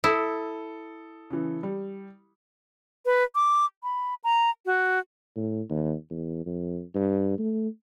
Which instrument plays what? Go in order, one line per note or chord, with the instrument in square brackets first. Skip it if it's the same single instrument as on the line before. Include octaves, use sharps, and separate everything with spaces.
[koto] E4 [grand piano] A4 D#6
[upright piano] C#3 E3
G3
[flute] B4
D6
B5
A#5
F#4
[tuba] A2
D#2
E2
F2
G2
A3